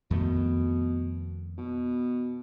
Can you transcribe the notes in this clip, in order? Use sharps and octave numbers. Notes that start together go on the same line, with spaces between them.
F2 B2 D#3 A3
B2